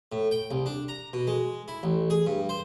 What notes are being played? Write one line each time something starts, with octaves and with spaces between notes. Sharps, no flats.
A2
G5
C2
D4
A#5
B2
G#3
E4
A1
G#4
G2
C5